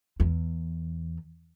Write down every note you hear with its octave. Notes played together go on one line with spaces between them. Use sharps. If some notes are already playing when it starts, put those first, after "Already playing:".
E2